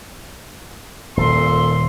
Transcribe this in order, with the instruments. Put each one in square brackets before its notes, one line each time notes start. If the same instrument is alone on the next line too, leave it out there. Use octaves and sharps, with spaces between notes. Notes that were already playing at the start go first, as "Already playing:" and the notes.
[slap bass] D#1 [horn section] A#2 A4 C6